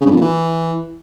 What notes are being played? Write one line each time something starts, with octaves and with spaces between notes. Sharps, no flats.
C#3
G2
F2
A#2
E3